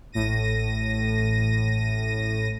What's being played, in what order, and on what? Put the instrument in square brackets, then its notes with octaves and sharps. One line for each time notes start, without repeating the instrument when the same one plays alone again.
[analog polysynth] A1 A2 A#6 D#7